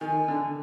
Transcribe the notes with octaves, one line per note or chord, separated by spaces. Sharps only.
D#3 G#5
D3